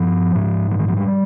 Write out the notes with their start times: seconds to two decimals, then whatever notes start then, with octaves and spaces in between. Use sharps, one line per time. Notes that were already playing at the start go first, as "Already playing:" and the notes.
Already playing: G2 F3
0.35 G#2
0.71 F3
0.79 D#3
0.88 F3
0.97 G3